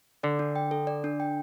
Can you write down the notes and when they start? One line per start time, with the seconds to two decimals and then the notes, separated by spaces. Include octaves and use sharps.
0.23 D3 D5
0.39 D4
0.56 G5
0.71 A4
0.87 D5
1.04 D4
1.20 G5